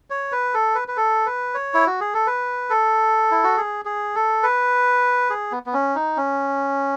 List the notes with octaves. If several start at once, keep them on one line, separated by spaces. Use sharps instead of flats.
C#5
B4
A4
B4
B4
A4
B4
C#5
E4
F#4
G#4
A4
B4
A4
E4
F#4
G#4
G#4
A4
B4
G#4
B3
B3
C#4
D#4
C#4